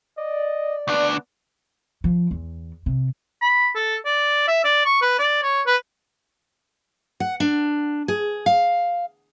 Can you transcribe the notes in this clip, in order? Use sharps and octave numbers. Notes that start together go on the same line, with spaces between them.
D5 D#5
D2 B3 D4
F3
E2
C3
B5
A4
D5
E5
D5
C#6
B4
D5
C#5
B4
F#5
D4
G#4
F5